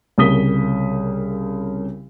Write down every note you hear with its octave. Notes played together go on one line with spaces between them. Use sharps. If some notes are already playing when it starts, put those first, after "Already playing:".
C2 C#3 A#4 D#6 B6 G7